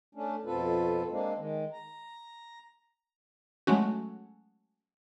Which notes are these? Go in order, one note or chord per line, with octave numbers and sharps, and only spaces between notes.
A3 C#4 D4
F2 B2 C4 F4 A4 B4
G#3 A#3 C4 D4
D#3 G#3
A#5
F#3 G#3 A3 C#4 F#4